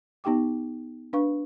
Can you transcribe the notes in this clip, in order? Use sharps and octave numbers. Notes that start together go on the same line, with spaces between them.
B3 D#4 G4 G5 D6
D4 B4 F5 C#6